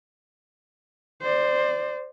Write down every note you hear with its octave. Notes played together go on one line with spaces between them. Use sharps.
C5 D5